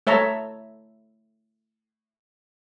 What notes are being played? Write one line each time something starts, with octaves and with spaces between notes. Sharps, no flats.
A3 C#5 E5 A5 A#5